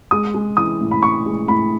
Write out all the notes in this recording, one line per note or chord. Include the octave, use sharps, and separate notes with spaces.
G#3 D#6
G#3
E3 D#6
A2
B5
A2 C#6
G#3
A2 B5